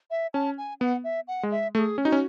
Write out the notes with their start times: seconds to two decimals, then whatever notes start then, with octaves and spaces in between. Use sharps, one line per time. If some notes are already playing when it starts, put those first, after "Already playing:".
0.11 E5
0.34 C#4 A5
0.58 G#5
0.80 B3 F#5
1.04 E5
1.28 F#5
1.43 G#3
1.51 E5
1.75 A3 A4
1.79 G#4
1.98 C#4
2.05 D#4 F#4
2.12 C#4